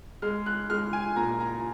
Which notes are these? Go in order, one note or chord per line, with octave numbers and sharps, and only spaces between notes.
G#3 F6
F#6
G#3 F6
G#5
A#2 A#5
A#5